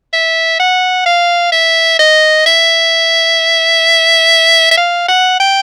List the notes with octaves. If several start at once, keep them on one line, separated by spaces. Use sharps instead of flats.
E5
F#5
F5
E5
D#5
E5
E5
F5
F#5
G5